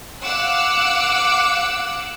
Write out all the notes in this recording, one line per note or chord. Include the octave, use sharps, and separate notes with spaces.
F5 F#5 D6 E6 F#6